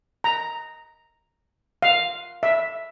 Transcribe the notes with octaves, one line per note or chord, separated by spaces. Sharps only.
A#5
F5
E5